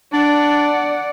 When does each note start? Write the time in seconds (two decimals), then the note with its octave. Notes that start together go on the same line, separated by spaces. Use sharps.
0.13 D4 D5 F#5